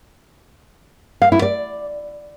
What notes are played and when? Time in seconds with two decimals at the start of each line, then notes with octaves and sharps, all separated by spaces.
1.22 F5
1.32 E4
1.42 D5